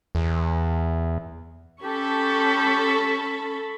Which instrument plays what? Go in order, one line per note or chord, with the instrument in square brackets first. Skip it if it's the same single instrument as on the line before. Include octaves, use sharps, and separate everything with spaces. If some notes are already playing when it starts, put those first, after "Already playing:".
[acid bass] E2
[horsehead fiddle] C#4 [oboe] G4 [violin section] A4 [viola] B5 C#6